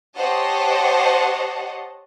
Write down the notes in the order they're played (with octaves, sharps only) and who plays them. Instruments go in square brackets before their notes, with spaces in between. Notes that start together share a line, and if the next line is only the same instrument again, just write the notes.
[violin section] G4 C5 C#5 D#5 F#5 A5